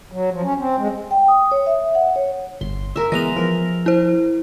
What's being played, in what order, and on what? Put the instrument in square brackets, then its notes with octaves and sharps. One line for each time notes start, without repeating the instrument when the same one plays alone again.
[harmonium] F#3
F3
C#4
C4
G#3
[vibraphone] G5
D#6
C#5
E5
F#5
C#5
[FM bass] G1 [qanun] C6
[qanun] A#4 E5
[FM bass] E3 [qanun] G#3 B3 [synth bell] A#6 F7
[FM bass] F3 [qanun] A#4
[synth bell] E4 C5